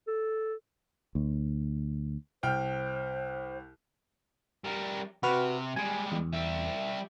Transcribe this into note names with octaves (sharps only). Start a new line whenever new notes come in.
A4
D2
C2 C5 G5 F6
G3 A#4
C3 F#4 B4 F6
G3 G#3 G#5
E2
G3 E5